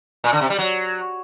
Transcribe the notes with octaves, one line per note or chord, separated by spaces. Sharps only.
A#2
D3
C3
G3
F#3